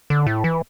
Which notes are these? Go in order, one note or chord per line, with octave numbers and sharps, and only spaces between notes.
D3
A2
E3